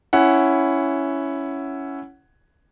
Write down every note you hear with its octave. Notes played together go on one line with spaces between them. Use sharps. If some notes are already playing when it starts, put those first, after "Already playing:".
C#4 E4 F#5